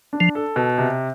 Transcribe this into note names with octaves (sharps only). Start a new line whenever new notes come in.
D4
F3
A4
B2
C3